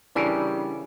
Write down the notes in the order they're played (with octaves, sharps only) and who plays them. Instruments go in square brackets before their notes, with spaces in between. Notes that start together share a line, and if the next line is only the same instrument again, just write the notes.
[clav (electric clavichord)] C#3 E3 A#4 [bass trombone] G3 [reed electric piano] D4 [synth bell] E4 G#5